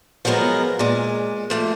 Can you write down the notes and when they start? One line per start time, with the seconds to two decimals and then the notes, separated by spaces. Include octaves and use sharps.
0.25 F3 F#3 G#3 B3 A#4
0.79 A#2 G#3
1.50 F3 A3 A#3